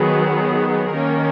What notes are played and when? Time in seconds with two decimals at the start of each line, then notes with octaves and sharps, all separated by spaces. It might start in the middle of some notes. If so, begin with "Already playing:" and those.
Already playing: D#3 F#3 B3 G#4
0.91 D#3 A#3 C#4 A#4